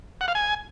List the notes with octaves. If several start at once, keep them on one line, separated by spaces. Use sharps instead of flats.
F#5
F5
G#5